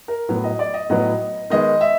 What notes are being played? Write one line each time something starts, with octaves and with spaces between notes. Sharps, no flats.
A#4
A2 F#3 B3
D#5
D5
D#5
A2 F#3 B3 D#5
D#3 G#3 B3 D#5
E5